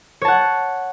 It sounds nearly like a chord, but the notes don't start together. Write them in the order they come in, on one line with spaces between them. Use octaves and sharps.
C#5 A5 F#5